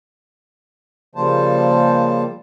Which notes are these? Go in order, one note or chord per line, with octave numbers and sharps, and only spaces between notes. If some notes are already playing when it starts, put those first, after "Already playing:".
C#3 F3 G3 A#3 C5 A5